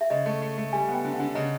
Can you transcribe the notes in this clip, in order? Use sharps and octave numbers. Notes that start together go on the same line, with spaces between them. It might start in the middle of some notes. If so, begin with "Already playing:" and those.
E5
C#3 D#5
A3
A3
A3
G3 G#5
B3
G5
D3
F#5
D3
C#3 D#5